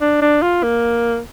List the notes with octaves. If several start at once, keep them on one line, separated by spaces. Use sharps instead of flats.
D4
D4
F4
A#3